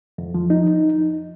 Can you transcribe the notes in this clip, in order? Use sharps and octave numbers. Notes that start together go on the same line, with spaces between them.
F2
F3
D#4